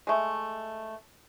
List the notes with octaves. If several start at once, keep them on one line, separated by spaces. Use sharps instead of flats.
G#3 A3